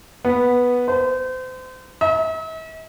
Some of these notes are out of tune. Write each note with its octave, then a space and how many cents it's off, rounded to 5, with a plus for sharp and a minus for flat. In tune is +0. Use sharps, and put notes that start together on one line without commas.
B3 -5
C5 -35
E5 -45